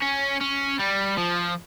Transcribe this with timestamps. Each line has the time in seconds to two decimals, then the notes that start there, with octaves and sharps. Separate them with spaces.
0.02 C#4
0.41 C#4
0.79 G3
1.18 F3